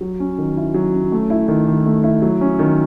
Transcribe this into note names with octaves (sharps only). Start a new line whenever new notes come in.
F#3
C#4
D#3
E4
F#3
C#4
A3
E4
D#3
D#3
A3
E4
F#3
C#4
D#3